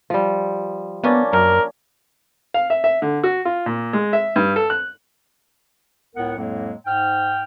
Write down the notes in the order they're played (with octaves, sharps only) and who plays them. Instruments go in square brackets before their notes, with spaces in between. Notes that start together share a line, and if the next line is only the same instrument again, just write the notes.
[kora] F3 G3
[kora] A#3 C#4 D4 [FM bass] B3
[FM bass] F#2 [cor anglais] A#4
[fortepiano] F5
E5
E5
D3
F#4
F4
A#2
G#3
E5
G2
A4
F#6
[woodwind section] C#2 A2 B3 A#4 F#5
F2 A2 F#3 G#3 A#3
G#2 G5 F6